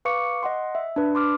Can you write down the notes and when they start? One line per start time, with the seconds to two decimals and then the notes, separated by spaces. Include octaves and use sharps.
0.05 B4 F5 C#6 D6 C#7
0.43 D#5 F#5 C6
0.75 E5
0.96 D4 B4
1.15 C6 D6 F6